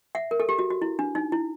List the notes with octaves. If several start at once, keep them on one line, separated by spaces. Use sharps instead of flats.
E5 F#5
A#4
A4
G4
F#4
F#4
E4
D4
D#4
E4